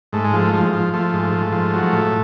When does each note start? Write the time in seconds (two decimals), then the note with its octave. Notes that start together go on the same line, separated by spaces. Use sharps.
0.13 G#2 A3
0.24 G#3
0.33 F3 A3
0.53 F3
0.73 F3
0.94 F3 A3
1.13 G#2
1.33 G#2
1.52 F3
1.73 F#3
1.93 A2